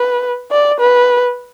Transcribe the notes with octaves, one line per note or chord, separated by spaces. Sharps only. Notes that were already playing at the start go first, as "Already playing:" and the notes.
Already playing: B4
D5
B4